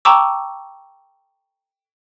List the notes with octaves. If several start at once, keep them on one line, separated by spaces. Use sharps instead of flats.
G5 A5 A#5 C#6 D6 E6